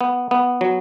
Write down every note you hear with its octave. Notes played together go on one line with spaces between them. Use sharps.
B3
B3
F#3